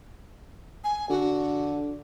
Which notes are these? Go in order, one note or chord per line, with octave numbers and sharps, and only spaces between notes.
G#5
D3 F#4